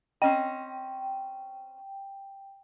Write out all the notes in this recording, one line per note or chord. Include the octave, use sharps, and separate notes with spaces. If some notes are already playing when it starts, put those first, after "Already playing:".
C4 C#4 D#5 G5